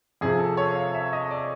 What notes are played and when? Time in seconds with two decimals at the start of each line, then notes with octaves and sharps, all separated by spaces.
0.21 F2 C3 F3 G#4
0.39 A4
0.57 C#5
0.75 F5
0.94 E5
1.13 D#5
1.31 D5